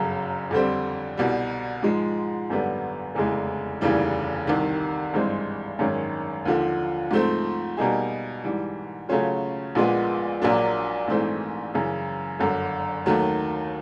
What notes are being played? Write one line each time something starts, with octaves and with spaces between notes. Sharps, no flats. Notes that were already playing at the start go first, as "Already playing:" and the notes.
Already playing: G1 F#2 C#3 F#3
F2 D3 G3 C4
C2 B2 G3
G#2 F3 G#3
G#1 F#2 D3 G3 B3
F1 E2 C#3 E3 G#3
F1 D#2 C#3 E3 G3
C2 C3 D#3
G#1 G2 E3 G#3 C4
G#1 F#2 D#3 G#3 C#4
D#2 D3 F3
G#2 F3 A3 C4
B2 G3 A#3 D#4 G#4
G#2 E3 G3
C#3 F#3 A3 C#4 F4
A#1 A#2 F3 G#3 B3
A#1 A#2 F#3 A#3 D4
A#1 G#2 E3 A3 C4
F#2 C#3 E3
G1 F#2 D3
D#2 D#3 F#3 A3